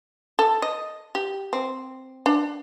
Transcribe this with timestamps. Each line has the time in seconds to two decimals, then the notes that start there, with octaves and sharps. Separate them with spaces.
0.39 A4
0.62 D#5
1.15 G4
1.53 C4
2.26 D4